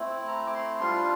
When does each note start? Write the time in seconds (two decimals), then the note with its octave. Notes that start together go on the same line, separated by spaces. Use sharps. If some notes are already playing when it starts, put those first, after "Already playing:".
Already playing: A3 C4 E4
0.28 A#5
0.47 D6
0.55 C6
0.80 G3 D4 F4 C6